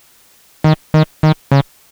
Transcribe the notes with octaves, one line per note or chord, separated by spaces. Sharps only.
D#3
D#3
D#3
C#3